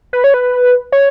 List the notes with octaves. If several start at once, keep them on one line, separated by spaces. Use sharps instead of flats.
B4
C#5
B4
C#5